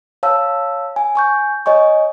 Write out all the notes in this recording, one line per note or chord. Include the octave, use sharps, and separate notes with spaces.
C#5 F5 A5 E6
G#5
G#5 C#6 G6
C#5 D#5 G#5 C#6